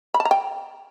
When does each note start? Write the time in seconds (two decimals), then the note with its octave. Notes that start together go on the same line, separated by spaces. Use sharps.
0.14 B5
0.20 A5
0.25 A#5
0.31 G5